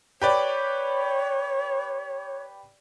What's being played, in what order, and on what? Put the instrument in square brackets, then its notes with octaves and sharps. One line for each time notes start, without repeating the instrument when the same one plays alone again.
[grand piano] G4 B4 D5 [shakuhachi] C#5